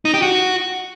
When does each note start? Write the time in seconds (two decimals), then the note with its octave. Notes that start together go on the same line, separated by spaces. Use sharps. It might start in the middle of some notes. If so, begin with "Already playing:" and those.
0.05 D#4
0.14 G4
0.22 F#4